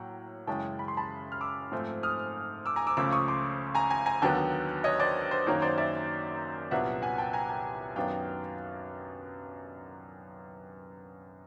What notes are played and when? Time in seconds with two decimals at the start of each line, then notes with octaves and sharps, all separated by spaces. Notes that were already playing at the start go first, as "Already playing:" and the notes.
Already playing: A2 F#3 A#3 F#5 G5
0.47 F#2 C#3 E3 G#3 C#4 G5 A5
0.79 B5
0.88 C6
0.97 A5 B5
1.32 F6
1.41 D6 E6
1.72 G#2 F3 A3 C4
2.03 D#6 F6
2.66 D6 E6
2.76 G#5 A#5
2.87 D6 E6
2.97 C#2 C#3 F3 A3 D6 E6
3.12 C#6 D#6
3.28 C6 D6
3.75 G#5 A#5
3.90 G#5 A#5
4.06 G#5 A#5
4.22 D#2 D3 F#3 B3 G5 A5
4.84 C#5 D#5
5.00 C5 D5
5.31 C5
5.47 F#2 D#3 F#3 A#3 C#5
5.62 C5 D5
5.78 D5 E5
6.71 C2 A#2 F#3 B3 D4 E5 F#5
7.02 F#5 G#5
7.18 G5 A5
7.33 G#5 A#5
7.49 G5 A5
7.96 F#2 D#3 F#3 B3 D4 F5 G5